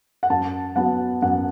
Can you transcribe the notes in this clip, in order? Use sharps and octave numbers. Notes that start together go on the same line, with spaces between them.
F#5
F#2 A5
F#3 B3 F#5
F#2 F#5